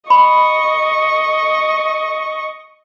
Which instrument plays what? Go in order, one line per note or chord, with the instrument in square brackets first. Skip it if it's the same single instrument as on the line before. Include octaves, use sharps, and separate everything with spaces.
[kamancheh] D#5 C#6 [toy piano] B5